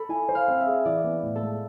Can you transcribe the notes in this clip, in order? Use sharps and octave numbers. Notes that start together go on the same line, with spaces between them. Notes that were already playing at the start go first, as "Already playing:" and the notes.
Already playing: A4 B5
E4 G#5
C5
F5
C4
E5
G#4
E3 D5
B3
A2
A4
G#3